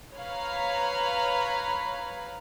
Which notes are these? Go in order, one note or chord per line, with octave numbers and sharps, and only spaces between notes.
B4 C#5 F5 A#5 B5